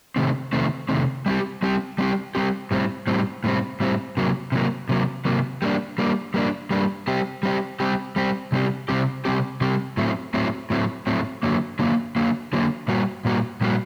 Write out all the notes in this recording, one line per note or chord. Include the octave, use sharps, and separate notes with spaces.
C3 D#3 A3 C4
C3 D#3 A3 C4
C3 D#3 A3 C4
G3 C4 G4
G3 C4 G4
G3 C4 G4
G3 C4 G4
A2 G3 C4
A2 G3 C4
A2 G3 C4
A2 G3 C4
C3 F#3 A#3
C3 F#3 A#3
C3 F#3 A#3
C3 F#3 A#3
G3 A#3 D4
G3 A#3 D4
G3 A#3 D4
G3 A#3 D4
G3 C4 G4
G3 C4 G4
G3 C4 G4
G3 C4 G4
C3 G3 C4 G4
C3 G3 C4 G4
C3 G3 C4 G4
C3 G3 C4 G4
A2 F#3 A3 C4
A2 F#3 A3 C4
A2 F#3 A3 C4
A2 F#3 A3 C4
D3 F#3 A#3
D3 F#3 A#3
D3 F#3 A#3
D3 F#3 A#3
A#2 G3 A#3 F#4
A#2 G3 A#3 F#4
A#2 G3 A#3 F#4